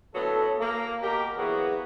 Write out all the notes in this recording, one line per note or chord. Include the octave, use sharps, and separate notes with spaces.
A2 D3 F#3 B3 A4
A#3
B2 G4 A#4
E3 F#3 A#3 B3 F#4 G#4